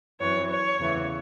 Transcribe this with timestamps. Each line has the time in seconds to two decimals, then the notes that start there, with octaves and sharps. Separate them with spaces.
0.21 F#2 E3 C4 C#5
0.49 C#5
0.79 E2 C#3 E3 A3